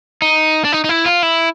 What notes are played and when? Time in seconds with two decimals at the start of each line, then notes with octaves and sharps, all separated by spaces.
0.22 D#4
0.65 D4
0.72 D#4
0.84 D#4
0.89 E4
1.06 F4
1.23 E4